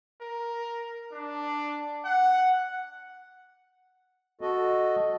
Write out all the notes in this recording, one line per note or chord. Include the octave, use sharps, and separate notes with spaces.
A#4
D4
F#5
F#4 A4 D#5